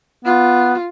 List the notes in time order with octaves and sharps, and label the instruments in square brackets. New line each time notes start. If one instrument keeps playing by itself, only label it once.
[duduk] B3 [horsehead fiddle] F4